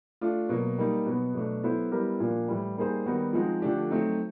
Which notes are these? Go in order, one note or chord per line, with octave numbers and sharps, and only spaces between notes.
A3 D4 F4
B2 F#3 A#3
G3 A#3 D#4
B2 F#3 B3
B2 F#3 A3 D4
F#3 B3 E4 A4 C5
G3 B3 E4 G4 A#4
A#2 F3 A#3 D4 F4
A2 E3 G3
G3 A#3 D#4 G#4 C5
D#3 G3 B3 D#4 F#4
F3 G#3 C4 D#4 F#4
D3 F3 A3 D4 G4
F#3 A3 C4 D#4